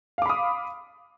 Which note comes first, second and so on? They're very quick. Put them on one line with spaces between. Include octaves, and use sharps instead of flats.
F5 D6 B5 D#6